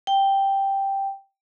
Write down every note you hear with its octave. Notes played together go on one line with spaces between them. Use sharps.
G5